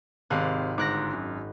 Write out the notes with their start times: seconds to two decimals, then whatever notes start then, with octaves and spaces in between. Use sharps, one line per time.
0.30 G#1 C3 F5 F#6
0.78 G1 G#2 D6 F#6 A#6
1.13 F#2